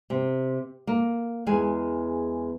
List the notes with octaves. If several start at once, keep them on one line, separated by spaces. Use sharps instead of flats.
C3
A#3
E2 G#3 G#4 G#5